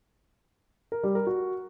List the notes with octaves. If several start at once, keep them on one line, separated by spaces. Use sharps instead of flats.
A#4
G3
A#4
F#4